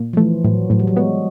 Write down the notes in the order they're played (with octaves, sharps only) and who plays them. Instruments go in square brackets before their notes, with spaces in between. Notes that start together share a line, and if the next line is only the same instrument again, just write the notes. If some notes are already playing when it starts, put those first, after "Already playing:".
Already playing: [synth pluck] A#2
[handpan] F3
[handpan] E3 [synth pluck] A3
[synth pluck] A2 [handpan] F#3
[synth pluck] A2 [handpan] F#3
[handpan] G3
F#3
[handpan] G#3 [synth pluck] B3